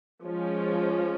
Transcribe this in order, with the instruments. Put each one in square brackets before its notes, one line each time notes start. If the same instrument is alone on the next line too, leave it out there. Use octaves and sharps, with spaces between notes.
[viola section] F3 G#3 C#4